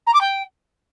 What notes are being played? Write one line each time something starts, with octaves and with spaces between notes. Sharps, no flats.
A#5
D6
G5